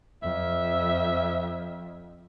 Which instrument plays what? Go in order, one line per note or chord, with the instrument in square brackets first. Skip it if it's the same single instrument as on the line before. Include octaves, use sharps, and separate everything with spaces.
[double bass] F2 [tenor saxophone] E5